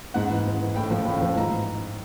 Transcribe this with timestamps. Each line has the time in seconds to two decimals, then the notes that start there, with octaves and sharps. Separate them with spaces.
0.14 G#2 F#5
0.30 E3
0.45 G#2
0.61 E3
0.76 A2 G5
0.91 F3
1.06 A2
1.22 F3
1.37 G#2 A#5
1.53 E3